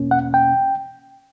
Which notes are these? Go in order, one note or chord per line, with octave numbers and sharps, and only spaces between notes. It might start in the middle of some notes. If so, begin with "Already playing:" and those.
Already playing: E2 B2 A#3 C#4
F#5
G5